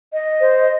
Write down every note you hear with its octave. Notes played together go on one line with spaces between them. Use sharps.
D#5
C5